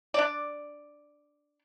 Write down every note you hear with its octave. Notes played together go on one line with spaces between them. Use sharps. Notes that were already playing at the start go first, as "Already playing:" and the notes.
D4 D5